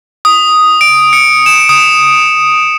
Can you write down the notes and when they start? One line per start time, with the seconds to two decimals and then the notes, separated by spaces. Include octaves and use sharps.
0.25 D#6
0.81 D7
1.13 C#7
1.46 E7
1.69 D#6